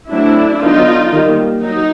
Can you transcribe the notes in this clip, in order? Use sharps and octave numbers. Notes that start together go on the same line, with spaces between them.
F#3 A3 C4 D4 E4
D3 F#3 B3 D4 D#4 F4
D#3 G3 A#3
F#3 D#4